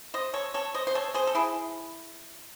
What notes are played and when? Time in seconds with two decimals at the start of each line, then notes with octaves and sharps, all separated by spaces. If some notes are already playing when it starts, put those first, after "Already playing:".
0.14 C5 D#5
0.34 A4 C#5
0.54 A4 C#5
0.74 C5 D#5
0.87 C5
0.95 A4 C#5
1.14 G#4 C5
1.27 A4
1.35 E4 G#4